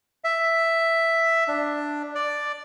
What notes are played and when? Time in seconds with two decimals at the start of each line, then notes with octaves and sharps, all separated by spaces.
0.24 E5
1.48 D4
2.15 D5